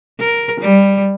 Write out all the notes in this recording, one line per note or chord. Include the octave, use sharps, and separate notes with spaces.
A#4
G3